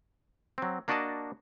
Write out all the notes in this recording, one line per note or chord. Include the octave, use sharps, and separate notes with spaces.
F#3 C4
A#3 D4 F#4 D5 D#5 A5